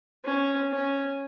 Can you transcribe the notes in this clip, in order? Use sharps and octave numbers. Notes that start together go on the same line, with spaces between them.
C#4
C#4